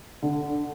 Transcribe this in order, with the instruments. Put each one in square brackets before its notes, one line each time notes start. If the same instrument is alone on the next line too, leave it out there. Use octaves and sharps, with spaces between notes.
[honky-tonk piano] D3